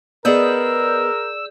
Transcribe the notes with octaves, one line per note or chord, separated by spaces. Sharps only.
B3 G#4 A#4 B4 D5 D#5 E6 G6